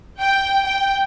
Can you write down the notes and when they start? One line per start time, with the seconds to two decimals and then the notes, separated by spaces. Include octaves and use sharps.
0.20 G5
0.65 G5